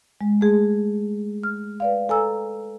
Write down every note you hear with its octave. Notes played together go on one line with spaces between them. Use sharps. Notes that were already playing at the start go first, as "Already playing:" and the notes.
G#3
A3 G#4
F6
B4 D5 F5
A4 G#5 A#5 E6